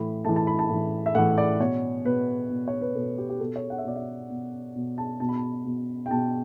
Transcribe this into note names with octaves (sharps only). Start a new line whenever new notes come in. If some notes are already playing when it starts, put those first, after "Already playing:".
Already playing: A2 E3 B5
A2 E3 A5
A5
B5
A5
A2 E3
E5
A2 E3 F#5
D5
B2 C#5
B2 B4
B2
C#5
B4
B2 A4
G4
G4
B2 A4
C#5
F#5
E5
B2 D5
E5
B2
B2
A5
B2 A5
B5
A5
B2
G5
B2 A5